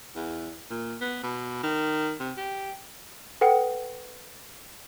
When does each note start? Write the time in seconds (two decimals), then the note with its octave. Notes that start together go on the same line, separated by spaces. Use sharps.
0.16 E2
0.71 A#2
1.01 B3
1.24 B2
1.64 D#3
2.20 C3
2.37 G4
3.41 A4 B4 F#5 G5